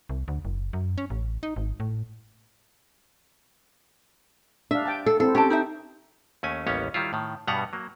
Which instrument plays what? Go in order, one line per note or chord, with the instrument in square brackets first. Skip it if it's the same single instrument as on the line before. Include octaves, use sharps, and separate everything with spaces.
[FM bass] C2
D2
F#1
F#2
C#4
A1
D#4
G#1
A2
[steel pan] D4 F5 [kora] E5
[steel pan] G5 A5
[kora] A4
[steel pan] C4 E4 [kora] A4
[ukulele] C#4 A5 [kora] G4 [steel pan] G5
[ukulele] D#4 C5 E5
[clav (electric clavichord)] D#2 A3 C#4 G#5
A1 D#2 G3 B3 C#4 C#5
D#3 G3 E4 F4
A2 D#3
G2 B2 G3 B3 F#5 A#5
F#3 A#3